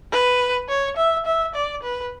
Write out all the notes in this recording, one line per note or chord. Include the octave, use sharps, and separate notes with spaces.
B4
C#5
E5
E5
D5
B4